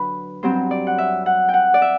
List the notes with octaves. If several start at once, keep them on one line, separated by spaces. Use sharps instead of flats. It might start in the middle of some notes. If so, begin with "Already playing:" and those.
Already playing: D3 F#3 B4
G2 F#3 C4 C5
D5
F#5
E5
F#5
G5
F#5
D5
E5